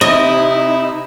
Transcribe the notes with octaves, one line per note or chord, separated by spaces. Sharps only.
C3 D#4 E4 D#5